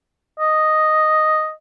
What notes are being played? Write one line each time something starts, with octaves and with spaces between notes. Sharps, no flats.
D#5